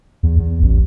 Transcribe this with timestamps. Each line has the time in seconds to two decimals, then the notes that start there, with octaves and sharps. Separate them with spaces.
0.23 E2
0.39 E2
0.62 A1